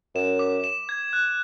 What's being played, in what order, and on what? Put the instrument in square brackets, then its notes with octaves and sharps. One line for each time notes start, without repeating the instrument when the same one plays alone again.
[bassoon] F#2 [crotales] E7
[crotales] D6
E7
G#6
F#6